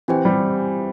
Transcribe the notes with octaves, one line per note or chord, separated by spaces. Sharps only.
E3 C4 G4 C5 G5
G3